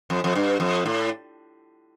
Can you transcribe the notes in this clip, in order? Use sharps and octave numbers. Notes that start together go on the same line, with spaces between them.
F2
F2
G2
F2
A2